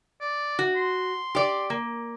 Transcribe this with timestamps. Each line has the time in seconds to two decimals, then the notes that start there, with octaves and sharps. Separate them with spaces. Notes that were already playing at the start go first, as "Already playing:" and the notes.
0.21 D5
0.59 F#4
0.76 C6
1.35 G4 D5
1.70 A#3